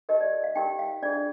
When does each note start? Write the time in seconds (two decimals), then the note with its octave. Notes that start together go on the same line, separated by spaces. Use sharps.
0.09 D#4 G4 A#4 D#5
0.21 D5
0.44 F5
0.55 D#4 G4 A#4 G5
0.79 F5
1.02 D4 F4 G#4 D5